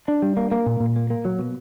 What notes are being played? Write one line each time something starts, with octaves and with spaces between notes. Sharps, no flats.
D4
G3
A#3
A#3
A#2
A#2
A#3
A#3
F#3
B2